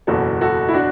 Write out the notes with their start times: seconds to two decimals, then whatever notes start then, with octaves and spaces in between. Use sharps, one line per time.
0.07 F#1 E2 B2 F#4 A4
0.41 F#4 A4
0.68 E4
0.74 D4 F#4